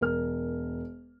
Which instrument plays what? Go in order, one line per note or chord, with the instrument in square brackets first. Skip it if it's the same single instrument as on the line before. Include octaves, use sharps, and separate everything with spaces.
[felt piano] E1 A#4 F6